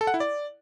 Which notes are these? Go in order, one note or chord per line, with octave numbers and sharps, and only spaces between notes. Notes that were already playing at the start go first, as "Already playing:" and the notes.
A4
F#5
E4
D5